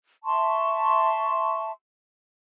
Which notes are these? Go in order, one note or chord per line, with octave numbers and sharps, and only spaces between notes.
E5 A5 C6 C#6